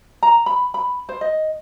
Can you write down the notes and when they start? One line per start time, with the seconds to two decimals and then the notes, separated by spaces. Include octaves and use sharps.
0.23 A#5
0.46 B5
0.74 B5
1.09 C5
1.21 D#5